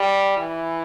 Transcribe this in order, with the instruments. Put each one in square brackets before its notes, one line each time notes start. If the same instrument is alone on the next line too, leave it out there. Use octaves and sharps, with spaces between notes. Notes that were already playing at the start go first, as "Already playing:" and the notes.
Already playing: [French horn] G3
E3